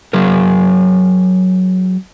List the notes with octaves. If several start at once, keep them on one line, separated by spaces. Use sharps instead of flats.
F#3 G#4 A#4